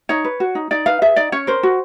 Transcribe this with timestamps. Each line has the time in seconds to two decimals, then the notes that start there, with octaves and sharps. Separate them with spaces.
0.09 D#4 C#5
0.25 B4
0.40 F#4
0.55 D#4
0.71 D#4 D5
0.86 B4 F5
1.02 G#4 E5
1.16 D#4 D5
1.32 C#4 C#5
1.47 A#4 C5
1.63 F#4